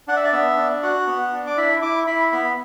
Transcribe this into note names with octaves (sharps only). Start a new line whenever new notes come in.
D4 F#5
E5
D5
B3 E5
D4
F#4 F#5
B3
D4
D6
E4 B5
E4 D6
E4 B5
B3 B5